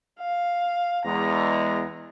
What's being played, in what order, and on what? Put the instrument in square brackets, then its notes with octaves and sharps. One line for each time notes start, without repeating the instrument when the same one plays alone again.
[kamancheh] F5
[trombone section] E2 G#3 [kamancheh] A#5